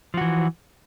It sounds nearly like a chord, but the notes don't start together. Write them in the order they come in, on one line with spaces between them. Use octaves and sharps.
F3 F#4 E3